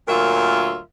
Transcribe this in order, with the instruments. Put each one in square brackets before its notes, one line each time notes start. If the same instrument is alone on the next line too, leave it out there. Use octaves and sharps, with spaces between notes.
[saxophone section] D2 A#2 F#3 F4 A#4 E5